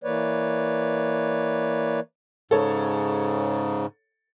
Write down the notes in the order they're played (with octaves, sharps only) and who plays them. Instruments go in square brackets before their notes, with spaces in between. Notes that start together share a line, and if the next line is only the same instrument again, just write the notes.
[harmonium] E3 A#3 B4 C#5 D5
[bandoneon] G#2 C#3 [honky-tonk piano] A4 C#5